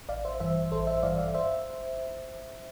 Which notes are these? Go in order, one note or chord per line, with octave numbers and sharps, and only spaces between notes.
A1 D5 F5
C5 E5
G2 E3 C5 E5
A1 A4 C5
C5 E5
G2 E3 D5 F5
D5 F5
G1 C5 E5